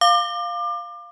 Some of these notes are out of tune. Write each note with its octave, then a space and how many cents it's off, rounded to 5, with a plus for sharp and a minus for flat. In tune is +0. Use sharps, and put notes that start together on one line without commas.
F5 +0 D6 +30